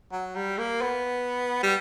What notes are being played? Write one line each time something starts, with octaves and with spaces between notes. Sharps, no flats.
F#3
G3
A#3
B3
G3